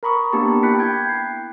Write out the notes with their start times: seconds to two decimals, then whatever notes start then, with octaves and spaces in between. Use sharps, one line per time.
0.03 A#4 A#5 B5 C#6 D#6
0.32 A#3 B3 D4 G4 A5 C#6
0.63 E4 G5 B5 F#6 B6 C#7
0.79 G5 G6 G#6
1.09 C7